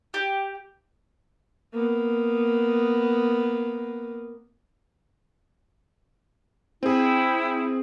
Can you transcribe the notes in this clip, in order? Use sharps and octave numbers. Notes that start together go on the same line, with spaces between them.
G4
A#3 B3
C4 E4 G#4 G5